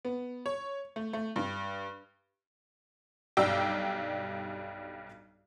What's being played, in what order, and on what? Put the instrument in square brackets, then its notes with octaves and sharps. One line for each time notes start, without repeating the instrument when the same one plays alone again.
[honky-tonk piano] B3
C#5
A3
A3
G2
B1 G2 G3 G5 D6 E6